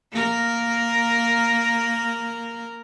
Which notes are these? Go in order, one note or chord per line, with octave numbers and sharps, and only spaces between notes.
A#3 A#4